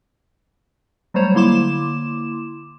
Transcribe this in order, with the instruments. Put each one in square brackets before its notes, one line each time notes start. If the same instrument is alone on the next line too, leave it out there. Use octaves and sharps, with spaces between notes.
[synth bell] F#3 G3 A3 C5 C#5
D3 A#3 E4 C6 D6 E7